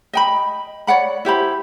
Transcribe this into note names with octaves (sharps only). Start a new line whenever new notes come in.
D#5 G5 B5
C#5 D5 F#5 B5
E4 G4 C5 B5